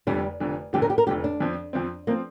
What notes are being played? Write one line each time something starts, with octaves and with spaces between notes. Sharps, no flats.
F1 F2 D3 G3
F1 F2 D3
F1 F2 D3 G4
A#4
G4
A#4
F1 F2 D3 G4
D4
F2 F3 C4
F2 F3 C4
F3 A#3 C4